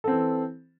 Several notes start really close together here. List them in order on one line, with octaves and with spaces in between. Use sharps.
A4 C4 E3